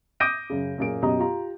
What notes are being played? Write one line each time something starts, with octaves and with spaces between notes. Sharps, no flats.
D6 D#6 G6 A#6 D7 D#7
F#2 C#3
F#2 A#2 A#3 G#4 D7
F#2 B2 G4 D#5 A#5 D#6
F4 G4 A#5